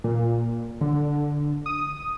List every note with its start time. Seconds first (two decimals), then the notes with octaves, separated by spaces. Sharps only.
0.04 A#2
0.81 D3
1.66 D#6